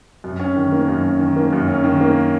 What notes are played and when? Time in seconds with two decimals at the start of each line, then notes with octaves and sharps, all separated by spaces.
0.24 F#2
0.40 C#4
0.56 D#3
0.72 A#3
0.88 F#2
1.04 C#4
1.20 D#3
1.36 A#3
1.53 F#2
1.68 C#4
1.84 D#3
2.01 A#3